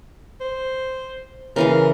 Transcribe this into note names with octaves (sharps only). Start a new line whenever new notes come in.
C5
C#3 E3 A#4 F5